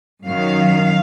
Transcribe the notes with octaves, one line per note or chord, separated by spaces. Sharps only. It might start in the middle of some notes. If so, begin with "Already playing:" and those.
F#2 D#3 F#3 F5